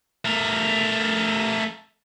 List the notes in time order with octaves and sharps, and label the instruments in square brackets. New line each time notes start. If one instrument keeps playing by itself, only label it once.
[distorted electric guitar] A3 A#4